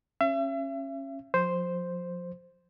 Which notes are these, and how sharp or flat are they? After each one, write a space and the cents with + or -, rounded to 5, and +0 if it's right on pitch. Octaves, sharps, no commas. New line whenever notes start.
C#4 -20 E5 +40
F3 +35 C5 +0